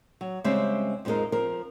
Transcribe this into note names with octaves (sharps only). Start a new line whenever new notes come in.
F#3
C#3 G3 G#3 C4 E5
F2 F3 G#3 C4 D#4 A#4
F3 C4 A#4